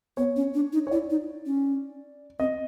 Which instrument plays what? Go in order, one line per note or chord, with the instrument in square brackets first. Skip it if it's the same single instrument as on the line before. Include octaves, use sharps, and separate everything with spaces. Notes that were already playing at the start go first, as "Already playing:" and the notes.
[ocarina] B3 [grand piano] C#5
[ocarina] C#4
D4
D#4
[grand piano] C#5
[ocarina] E4 [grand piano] D5
[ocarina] D#4
C#4
[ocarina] C4 [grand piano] D#5